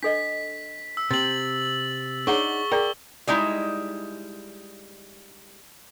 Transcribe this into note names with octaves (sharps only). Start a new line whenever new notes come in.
D4 A4 D#5 B6
E6
C3 C4 A6 F#7
D4 D#4 G#4 C#5 F#5 C#6 G7
G#4 A#4 D5 G5
G3 G#3 D#4 E4